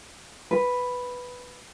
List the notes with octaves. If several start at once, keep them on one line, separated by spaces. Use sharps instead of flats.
B4